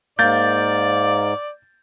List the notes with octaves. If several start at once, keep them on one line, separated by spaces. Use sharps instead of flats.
G#2 A#3 D5 G6 A6